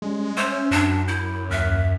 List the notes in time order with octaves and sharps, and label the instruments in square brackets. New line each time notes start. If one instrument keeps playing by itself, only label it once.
[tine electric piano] G3 C#4 [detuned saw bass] G#3
[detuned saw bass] C#4 [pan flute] C5 [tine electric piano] E5 C6 E6
[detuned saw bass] F#2 [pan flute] D4
[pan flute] E4 [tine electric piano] G6
[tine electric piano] D#2 F6 F#6 [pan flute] E5